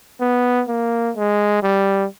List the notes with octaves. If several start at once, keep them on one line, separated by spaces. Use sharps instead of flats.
B3
A#3
G#3
G3